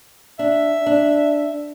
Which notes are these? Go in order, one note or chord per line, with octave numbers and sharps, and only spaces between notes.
D4 E5
D4